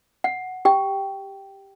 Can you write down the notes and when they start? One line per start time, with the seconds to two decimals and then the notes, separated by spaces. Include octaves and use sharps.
0.24 F#5
0.65 G4 G5